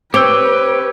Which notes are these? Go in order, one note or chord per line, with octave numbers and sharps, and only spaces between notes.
C4 G4 B4 C#5 G5 D6 E6